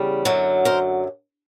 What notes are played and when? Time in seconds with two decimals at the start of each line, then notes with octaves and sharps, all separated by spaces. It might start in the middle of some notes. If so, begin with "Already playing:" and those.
Already playing: E2 C#3 G3
0.25 F#2 D3 F#3
0.65 A#4 C5